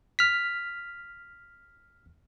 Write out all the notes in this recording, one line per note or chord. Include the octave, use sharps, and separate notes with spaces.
F6 B6